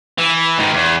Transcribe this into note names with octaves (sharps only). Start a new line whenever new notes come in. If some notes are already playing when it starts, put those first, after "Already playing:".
E3
G#2 D#3
E2